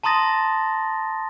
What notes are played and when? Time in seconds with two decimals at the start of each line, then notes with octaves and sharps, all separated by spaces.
0.03 A5 A#5 C6 D#6 A6 A#6